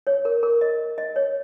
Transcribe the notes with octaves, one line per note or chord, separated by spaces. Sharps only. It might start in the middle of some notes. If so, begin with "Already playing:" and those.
C#5
A#4
A#4
D#5
D#5
C#5